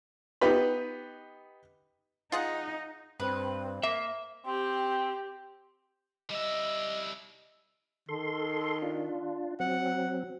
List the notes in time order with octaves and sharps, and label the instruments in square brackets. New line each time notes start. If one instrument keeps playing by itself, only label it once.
[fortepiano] B3 D#4 G4 B4 B5
[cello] D#4 [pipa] F4 G#4 F#5
[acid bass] G2 [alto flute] C4 [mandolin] B4
[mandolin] A#3 [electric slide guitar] E5
[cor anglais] C4 [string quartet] G4
[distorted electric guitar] G3 E5 [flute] D#5
[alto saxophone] D#3 [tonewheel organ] A4 C6
[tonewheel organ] D4 F4
[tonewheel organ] F#3 C4 [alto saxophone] F#5